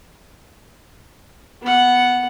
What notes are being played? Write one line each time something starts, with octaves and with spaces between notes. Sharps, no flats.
B3 F#5